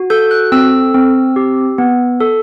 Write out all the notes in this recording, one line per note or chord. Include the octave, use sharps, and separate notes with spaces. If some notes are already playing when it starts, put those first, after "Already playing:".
Already playing: F#4
A4 G6
F#6
C4 E6
C4
G4
B3
A4